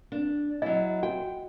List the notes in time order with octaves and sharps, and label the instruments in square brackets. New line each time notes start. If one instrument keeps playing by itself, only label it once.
[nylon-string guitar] D4
[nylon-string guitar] F#3 E4 [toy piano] D#5
[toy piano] F#4 [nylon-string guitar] G5